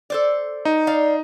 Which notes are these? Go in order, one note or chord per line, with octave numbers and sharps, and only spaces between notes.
A4 C5 D5
D#4
D5 F5